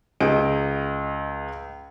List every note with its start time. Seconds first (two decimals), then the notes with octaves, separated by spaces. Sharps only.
0.20 C#2 D#5 D7